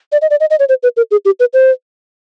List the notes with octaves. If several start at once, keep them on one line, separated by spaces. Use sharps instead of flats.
D5
D#5
D5
D#5
D#5
C#5
C5
B4
A#4
G#4
G4
B4
C5